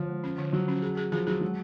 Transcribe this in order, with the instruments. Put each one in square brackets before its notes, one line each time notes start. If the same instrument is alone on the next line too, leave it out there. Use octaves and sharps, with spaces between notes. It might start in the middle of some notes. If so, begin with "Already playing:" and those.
Already playing: [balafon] D3 [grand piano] F3
[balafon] G#3
C#4
D3
[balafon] D3 [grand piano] F#3
[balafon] C#4
G#4
G#4
[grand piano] F3 [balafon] G#4
[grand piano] F#3 [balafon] G#4
[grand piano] F#3 [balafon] G#3